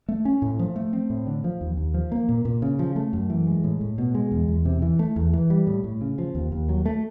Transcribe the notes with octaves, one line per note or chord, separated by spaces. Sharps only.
A3
C#4
A2
F3
A3
C4
A2
D3
F3
D#2
D#2
F3
A#3
A#2
A#2
C#3
F3
A3
F#2
E3
G#3
A2
A2
B2
G#3
E2
E2
C3
E3
A3
E2
E3
G3
A2
A2
C#3
F3
D#2
D#2
F#3
A3